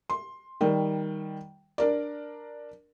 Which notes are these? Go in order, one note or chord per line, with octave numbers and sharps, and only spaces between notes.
C6
D#3 G3
D4 A#4 D5